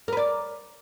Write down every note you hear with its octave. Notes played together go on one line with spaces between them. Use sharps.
A#4 B4 D5